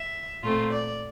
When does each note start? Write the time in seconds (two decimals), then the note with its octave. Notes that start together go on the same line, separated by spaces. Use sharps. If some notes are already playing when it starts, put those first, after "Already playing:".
Already playing: E5
0.43 A#2 A3 C4 F4
0.71 D5